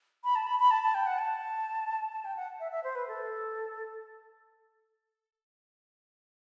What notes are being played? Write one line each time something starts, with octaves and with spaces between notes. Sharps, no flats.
B5
A5
B5
B5
A5
A5
G5
F#5
A5
A5
G5
F#5
E5
E5
C5
B4
A4